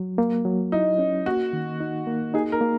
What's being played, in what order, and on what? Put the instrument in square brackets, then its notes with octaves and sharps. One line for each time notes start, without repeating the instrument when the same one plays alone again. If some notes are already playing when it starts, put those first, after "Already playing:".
Already playing: [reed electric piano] F#3
A#3
F#3
[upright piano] D#4 [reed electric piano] E4
[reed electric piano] C#4
[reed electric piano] A#3 [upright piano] F#4
[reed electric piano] D#3
D#4
A#3
[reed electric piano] D#4 [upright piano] G#4
[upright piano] A#4
[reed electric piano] A#3